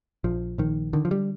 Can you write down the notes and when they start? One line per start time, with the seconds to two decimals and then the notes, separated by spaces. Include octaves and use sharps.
0.24 A#1 F3
0.58 A#1 D#3
0.93 D3 D#3
1.05 F3
1.11 G3